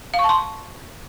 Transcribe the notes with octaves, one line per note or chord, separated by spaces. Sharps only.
F5
C#6
A5
C6